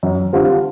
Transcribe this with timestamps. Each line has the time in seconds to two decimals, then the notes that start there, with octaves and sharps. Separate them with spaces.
0.03 F#2
0.33 D3 G3 C4 F4